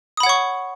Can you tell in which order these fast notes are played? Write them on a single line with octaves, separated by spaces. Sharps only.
D#6 B5 F#5 C#5 C#6